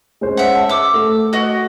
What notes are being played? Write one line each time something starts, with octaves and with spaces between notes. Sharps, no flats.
G#3 C#4 C5
E5 F#5
A5
D6 E6
A3
F#4 D#5